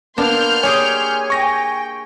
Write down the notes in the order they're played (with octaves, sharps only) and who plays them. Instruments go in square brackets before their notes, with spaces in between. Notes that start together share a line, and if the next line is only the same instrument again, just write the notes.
[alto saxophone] A#3 [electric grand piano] B3 [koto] D4 [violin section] C6 F6 G6
[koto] A#3 G4 G#4 [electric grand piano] C#5 [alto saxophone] G#5
[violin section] G5 [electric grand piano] C#6 A#6